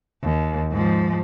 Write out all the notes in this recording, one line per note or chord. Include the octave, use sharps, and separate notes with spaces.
D#2
G#2 F3